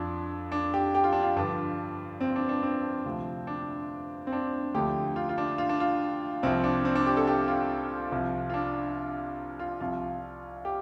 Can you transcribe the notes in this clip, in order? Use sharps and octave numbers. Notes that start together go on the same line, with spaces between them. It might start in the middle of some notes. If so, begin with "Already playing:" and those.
Already playing: F2 F3 D4
D4
G4
G4
F4
D4
F4
G2 D3 F3 D4
C4
D4
D4
C4
D2 C3 F3
D4
C4
D4
D2 D3 F3 G4
F4
F4
D4
F4
D4
F4
C2 C3 F3 C4
D4
C4
D4
G4
A4
G4
F4
C2 C3 F3
F4
D4
F4
C2 C3 F3 F4
G4